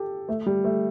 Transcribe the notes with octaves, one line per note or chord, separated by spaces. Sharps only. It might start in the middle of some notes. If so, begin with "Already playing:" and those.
Already playing: G4 A4
A3
G3
A3